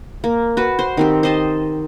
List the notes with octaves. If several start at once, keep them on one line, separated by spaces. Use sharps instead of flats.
A#3
F#4 B4
C5
D#3 C4 G4
C5 D#5 A5